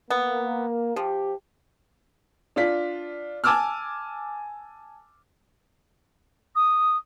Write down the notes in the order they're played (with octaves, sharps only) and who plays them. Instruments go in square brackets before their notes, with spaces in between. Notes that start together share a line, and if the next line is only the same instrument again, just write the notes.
[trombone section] A#3 [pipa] B3
[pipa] F3 [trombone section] G4
[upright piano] D4 F4 B6
G#5 A5 D6 E6 F6
[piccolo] D#6